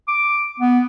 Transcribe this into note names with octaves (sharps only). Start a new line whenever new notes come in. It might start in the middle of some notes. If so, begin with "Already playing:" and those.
D6
B3